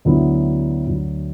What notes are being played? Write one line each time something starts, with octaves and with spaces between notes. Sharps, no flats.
D2 D3 F#3 B3 E4
D2 D3 F#3